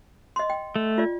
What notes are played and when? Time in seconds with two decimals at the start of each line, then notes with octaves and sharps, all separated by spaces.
0.36 D#5 C6
0.50 G5
0.76 A3
0.98 F4 D5